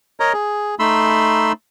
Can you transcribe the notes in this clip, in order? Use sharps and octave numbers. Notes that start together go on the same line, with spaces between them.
A#4 C#5 D#5 A#5
G#4
A3 D#4 B5 C6 E6